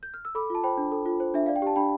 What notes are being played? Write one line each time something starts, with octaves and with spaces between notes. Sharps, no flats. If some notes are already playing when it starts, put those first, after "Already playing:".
G6
F6
E6
A4 B5 D6
F4 A5
C5 G5 B5
D4
A4
F4
C5
D4 E5
D5 F5
G5
G4 A5
D4 G5 B5